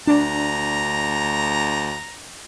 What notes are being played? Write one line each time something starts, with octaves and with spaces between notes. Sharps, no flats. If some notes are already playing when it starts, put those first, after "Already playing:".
D2 D4 A#5